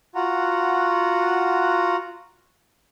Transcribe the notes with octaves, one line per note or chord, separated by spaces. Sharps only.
F4 F#4 F#5 A#5